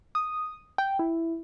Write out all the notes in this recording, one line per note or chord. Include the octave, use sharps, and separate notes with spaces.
D#6
G5
E4